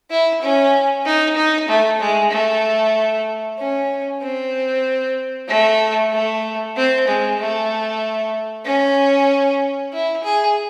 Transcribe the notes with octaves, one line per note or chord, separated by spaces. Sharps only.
E4
C#4
D#4
D#4
A3
G#3
A3
C#4
C4
A3
A3
C4
G#3
A3
C#4
E4
G#4